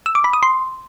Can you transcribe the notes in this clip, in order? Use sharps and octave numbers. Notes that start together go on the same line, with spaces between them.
E6
D6
B5
D#6
C6